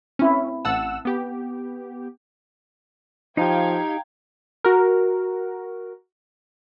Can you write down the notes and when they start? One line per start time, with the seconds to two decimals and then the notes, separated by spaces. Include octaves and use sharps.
0.19 C4 C#4 E4
0.65 A1 F#5 A5 E6
1.05 B3 G4
3.37 F3 D#4 G4 F5 G5 A#5 G#6
4.64 F#4 A#4